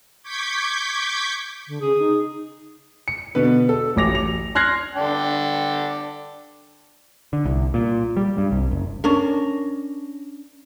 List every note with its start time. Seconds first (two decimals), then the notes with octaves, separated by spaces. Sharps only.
0.22 C#6 D6 G6 G#6 B6
1.68 D3
1.81 C#3 G#4
1.98 D#4
3.08 C#7
3.35 B2 D3 B3 B4
3.69 A4
3.96 D1 A1 D6 A#6 F7
4.15 F7
4.55 C6 F6 F#6 G#6 A#6 C7
4.95 D3 D4 G5
7.33 D3
7.45 C2
7.74 A#2
8.17 G3
8.38 G2
8.52 C2
8.71 F#1
9.04 C#4 D4 A#4